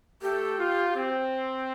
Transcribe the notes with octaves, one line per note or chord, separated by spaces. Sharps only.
A3 G4 A4
F4
C4